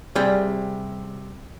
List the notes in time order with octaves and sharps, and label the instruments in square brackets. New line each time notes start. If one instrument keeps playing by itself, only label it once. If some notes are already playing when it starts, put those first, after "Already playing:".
[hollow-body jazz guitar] C3 G3 G#4 D5 G5